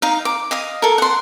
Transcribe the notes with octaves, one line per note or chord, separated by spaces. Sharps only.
D#4 F5
D6
D#5 F5 D#6
A4 A#4
F#5 C6